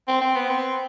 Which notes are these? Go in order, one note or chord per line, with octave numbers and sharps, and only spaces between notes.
C4
C4
B3
C4